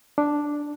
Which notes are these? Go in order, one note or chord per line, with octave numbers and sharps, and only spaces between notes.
D4